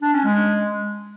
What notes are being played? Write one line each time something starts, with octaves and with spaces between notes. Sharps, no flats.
D4
C#4
G#3